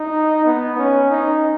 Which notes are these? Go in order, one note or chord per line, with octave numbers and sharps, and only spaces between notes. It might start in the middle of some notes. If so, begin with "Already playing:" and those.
Already playing: D#4
B3
C#4
D#4